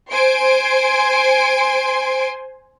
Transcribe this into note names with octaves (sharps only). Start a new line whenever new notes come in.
C5 G#5 C6 D7